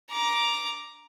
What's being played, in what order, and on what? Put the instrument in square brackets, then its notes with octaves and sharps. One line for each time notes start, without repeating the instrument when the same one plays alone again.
[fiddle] A#5 D6